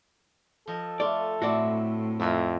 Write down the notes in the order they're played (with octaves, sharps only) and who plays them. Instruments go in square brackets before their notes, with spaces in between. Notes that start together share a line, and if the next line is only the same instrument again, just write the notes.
[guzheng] F3 D#5 [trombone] A4
[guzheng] A3 F4 [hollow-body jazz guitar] D5
[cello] A2 [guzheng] A3 C4 E4 [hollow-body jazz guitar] F#4 D5
[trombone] F2 [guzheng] A#4 B4 E5